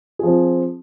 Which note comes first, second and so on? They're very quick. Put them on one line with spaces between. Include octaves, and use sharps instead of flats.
G#4 F3 C4